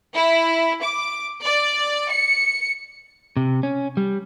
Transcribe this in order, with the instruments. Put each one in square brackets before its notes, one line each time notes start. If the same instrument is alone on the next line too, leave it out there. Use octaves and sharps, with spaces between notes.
[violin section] E4
D6
D5
C#7
[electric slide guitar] C3
C#4
G3